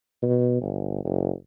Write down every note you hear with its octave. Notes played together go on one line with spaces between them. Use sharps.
B2
G1
F#1